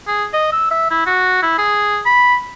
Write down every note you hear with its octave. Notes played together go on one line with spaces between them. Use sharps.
G#4
D#5
E6
E5
E4
F#4
E4
G#4
B5